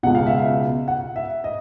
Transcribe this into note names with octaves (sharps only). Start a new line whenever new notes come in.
C#2 B2 F#5
F5
E5
F5
F#5
E5
D#5